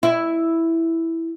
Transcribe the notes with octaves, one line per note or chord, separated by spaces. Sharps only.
E4